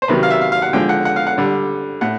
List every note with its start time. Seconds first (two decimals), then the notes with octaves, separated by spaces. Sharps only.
0.02 C5
0.08 C3 D#3 F#3 B4
0.23 F5
0.30 E5
0.41 F5
0.52 F5
0.62 F#5
0.73 D3 F3 G#3 G5
0.89 F#5
1.05 F#5
1.16 F5
1.27 F#5
1.38 D3 G3
2.01 A2 F#5